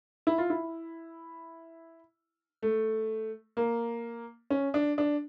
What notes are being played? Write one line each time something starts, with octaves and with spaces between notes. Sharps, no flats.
E4
F4
E4
A3
A#3
C#4
D4
D4